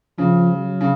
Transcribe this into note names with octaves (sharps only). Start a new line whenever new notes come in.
C#3 F3
F#3
C#3